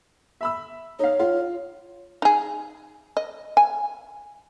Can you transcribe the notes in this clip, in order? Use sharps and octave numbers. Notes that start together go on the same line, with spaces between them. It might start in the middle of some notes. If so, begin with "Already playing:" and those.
E5 B5 E6
D#4 C#5 F5
F4
D#4 G#4
D#5
G#5